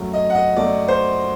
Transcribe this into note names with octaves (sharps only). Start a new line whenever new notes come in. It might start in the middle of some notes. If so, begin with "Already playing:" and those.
Already playing: F#2 F#3 A3
D#5
F#5
D#5
F#2 F#3 A3 D5
C5